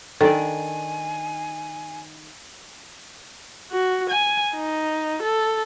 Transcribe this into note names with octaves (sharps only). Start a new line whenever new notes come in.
D#3 D4 A4 D5 G#5
F#4
G#5
D#4
A4